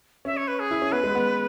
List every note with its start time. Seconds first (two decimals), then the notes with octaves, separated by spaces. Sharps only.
0.25 C#4 E5
0.37 C#5
0.48 B4
0.60 G#4
0.71 E4
0.82 C#4
0.92 B3 B4
1.04 G#3
1.15 B3